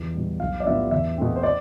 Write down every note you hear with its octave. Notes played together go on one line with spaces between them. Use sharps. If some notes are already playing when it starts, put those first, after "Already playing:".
Already playing: E2
B2 G3
B1 F5
D5
A2 F3 B3 E5
E2 E5
B2 A3 C4
C5
D5